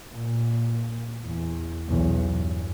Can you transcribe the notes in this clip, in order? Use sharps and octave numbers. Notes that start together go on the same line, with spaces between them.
A#2
E2
B1 E2
G2